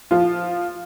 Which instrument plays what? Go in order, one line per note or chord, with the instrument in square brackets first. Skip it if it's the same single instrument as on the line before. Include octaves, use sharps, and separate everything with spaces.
[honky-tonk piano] F3 F4